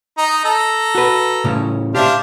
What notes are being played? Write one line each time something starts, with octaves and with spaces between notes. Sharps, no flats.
D#4 A#5
A4 A#5
F#4 B4
A2 C#3 C#4
D4 G4 C5 E5 F5